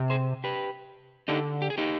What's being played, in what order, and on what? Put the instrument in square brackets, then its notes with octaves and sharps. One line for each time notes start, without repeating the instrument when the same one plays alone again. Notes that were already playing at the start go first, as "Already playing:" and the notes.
Already playing: [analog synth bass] C3
[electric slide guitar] G#4 C5
G4 B4
[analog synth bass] D3 [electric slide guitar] D#4 G4
[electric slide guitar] G4
G#4
D#4 G4